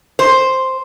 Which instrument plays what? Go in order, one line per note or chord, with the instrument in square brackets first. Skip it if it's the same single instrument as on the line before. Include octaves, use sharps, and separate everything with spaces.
[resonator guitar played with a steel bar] C5